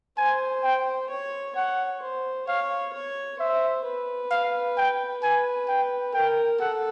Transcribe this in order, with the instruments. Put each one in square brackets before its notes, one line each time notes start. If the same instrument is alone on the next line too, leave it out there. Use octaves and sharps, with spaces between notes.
[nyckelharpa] C5 [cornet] G#5
[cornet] G5
[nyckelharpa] C#5
[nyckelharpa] C#5 [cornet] F#5
[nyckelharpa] C5
[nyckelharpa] C#5 [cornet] F5
[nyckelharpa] C#5
[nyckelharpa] C5 [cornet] E5
[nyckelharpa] B4
[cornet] F5
G5
[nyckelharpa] B4 [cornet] G#5
[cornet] G5
[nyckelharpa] A#4 [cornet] G5
[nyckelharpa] A4 [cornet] F#5